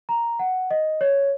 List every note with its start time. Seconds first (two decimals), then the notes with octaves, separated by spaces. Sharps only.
0.09 A#5
0.39 F#5
0.71 D#5
1.01 C#5